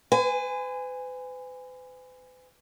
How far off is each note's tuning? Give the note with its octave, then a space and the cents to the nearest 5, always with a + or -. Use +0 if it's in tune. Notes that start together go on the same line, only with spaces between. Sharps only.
B4 +45 G#5 -15